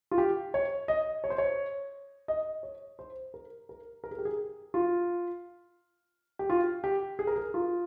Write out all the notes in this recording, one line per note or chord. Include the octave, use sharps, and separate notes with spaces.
F4
G4
C#5
D#5
C#5
C5
C#5
D#5
C#5
C5
A#4
A#4
A#4
G#4
G4
G#4
F4
G4
F4
G4
G#4
A#4
G#4
F4